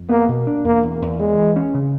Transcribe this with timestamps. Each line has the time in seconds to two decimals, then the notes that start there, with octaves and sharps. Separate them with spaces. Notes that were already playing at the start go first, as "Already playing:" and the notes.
Already playing: F2
0.09 A#3 B3
0.28 B2
0.47 D4
0.64 E2 A#3
0.83 E2
1.02 E2
1.20 E3 G#3
1.38 E3
1.56 C#4
1.74 C#3